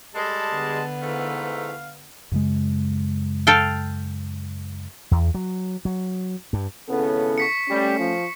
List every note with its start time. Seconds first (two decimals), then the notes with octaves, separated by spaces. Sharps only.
0.15 G3 G#3 A4 A5
0.52 D3 B3
1.02 G#2 E3 A3 F5
2.32 F#2 C#3 G#3
3.47 A4 F5 G5
5.11 E2
5.35 F#3
5.85 F#3
6.53 G2
6.88 G#1 C#3 B3 C#4 E4 A4
7.38 C#6 B6 C#7
7.68 G3 A3 C#4
7.98 F3